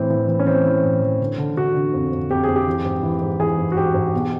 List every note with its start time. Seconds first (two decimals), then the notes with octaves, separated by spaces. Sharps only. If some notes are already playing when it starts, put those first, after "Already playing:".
Already playing: A2 E3 C4
0.10 E3
0.28 E3
0.40 C#4
0.47 E3 C4
0.65 E3
0.84 A2
1.02 E3
1.21 D3
1.38 D3
1.57 D3 F#4
1.75 D3
1.93 F2
2.12 F2
2.30 F2 G4
2.44 F2 G#4
2.56 G4
2.67 E3
2.85 G#2
3.03 E3
3.22 G#2
3.39 E3 G#4
3.58 G#2
3.72 F#4
3.77 G#2 G4
3.94 G#2
4.14 B2